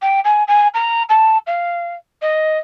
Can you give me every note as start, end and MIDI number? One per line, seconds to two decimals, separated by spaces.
0.02 0.20 79
0.24 0.44 80
0.48 0.68 80
0.74 1.03 82
1.09 1.37 81
1.47 1.94 77
2.22 2.58 75